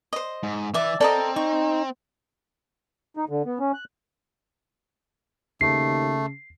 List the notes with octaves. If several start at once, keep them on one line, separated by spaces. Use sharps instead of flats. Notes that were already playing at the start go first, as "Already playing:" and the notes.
C5 D#5
G#2
E3 D5 E5
C4 A4 A#4 D5 D#5
D#4 C#6
D#4
D3
B3
C#4
F#6
D#2 C#3 A3 C7